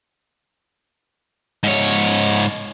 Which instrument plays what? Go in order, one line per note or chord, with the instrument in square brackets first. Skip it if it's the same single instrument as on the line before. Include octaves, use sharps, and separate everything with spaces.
[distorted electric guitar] G#2 C#5